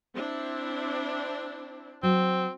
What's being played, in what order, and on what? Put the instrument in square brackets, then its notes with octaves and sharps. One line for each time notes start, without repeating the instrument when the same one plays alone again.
[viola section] C4 D4 E4
[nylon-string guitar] F#3 [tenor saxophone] C4